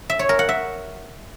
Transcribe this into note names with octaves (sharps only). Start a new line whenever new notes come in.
E5
C#5
A#4
F#5
E5